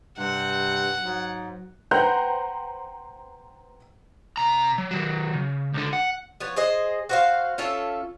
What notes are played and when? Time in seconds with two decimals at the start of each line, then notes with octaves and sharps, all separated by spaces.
0.18 G2 C3 F#5
1.04 G#2 F#3
1.91 B4 C5 F#5 G5 A#5 G6
4.38 C3 A#5
4.78 F#3
4.91 D#3 F#3
5.34 C#3
5.74 C#2 D3
5.93 F#5
6.40 F3 B3 C#5
6.56 G#4 C5 D#5
7.09 F#4 C5 F5
7.58 C#4 F4 A4 E5